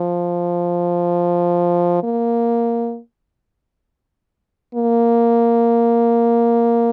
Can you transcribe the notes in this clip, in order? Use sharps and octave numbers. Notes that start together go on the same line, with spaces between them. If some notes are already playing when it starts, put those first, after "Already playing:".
Already playing: F3
A#3
A#3